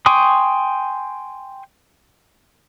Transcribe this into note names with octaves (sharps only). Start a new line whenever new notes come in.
G5 G#5 C6 C#6 D#6